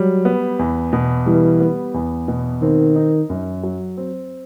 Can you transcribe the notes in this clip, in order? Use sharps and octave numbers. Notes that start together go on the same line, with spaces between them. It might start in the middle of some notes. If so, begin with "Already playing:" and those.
Already playing: F#3 G3
B3
E2
B2
E3 G3
B3
E2
B2
D#3 C4
D#4
F#2
F#3
C4